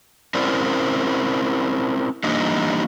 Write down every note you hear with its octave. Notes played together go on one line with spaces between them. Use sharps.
C4 C#4 E4 A#4 C5 D5
E3 G3 A#3 D4 D#4